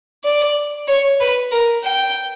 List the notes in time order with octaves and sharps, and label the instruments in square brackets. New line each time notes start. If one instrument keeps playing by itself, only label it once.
[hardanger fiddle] D5
C#5
B4
A#4
G5